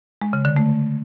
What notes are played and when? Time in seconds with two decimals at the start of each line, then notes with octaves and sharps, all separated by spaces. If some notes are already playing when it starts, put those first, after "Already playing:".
0.21 G#3
0.33 C#3
0.45 D3
0.56 A3